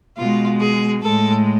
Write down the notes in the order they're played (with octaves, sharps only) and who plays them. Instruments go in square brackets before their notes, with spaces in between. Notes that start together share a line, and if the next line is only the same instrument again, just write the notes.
[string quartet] B2 G#3 F4
G#4
A2 G#3 A4